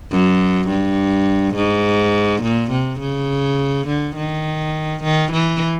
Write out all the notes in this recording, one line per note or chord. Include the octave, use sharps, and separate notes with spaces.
F#2
G2
G#2
A#2
C3
C#3
D3
D#3
D#3
E3